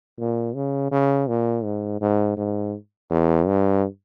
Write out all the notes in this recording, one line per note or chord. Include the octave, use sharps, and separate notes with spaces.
A#2
C#3
C#3
A#2
G#2
G#2
G#2
E2
G2